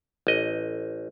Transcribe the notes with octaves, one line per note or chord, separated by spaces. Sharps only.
A1 D#5